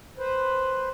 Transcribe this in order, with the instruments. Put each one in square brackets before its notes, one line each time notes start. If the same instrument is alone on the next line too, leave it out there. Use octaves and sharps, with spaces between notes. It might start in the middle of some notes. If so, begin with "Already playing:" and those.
[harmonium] B4 C5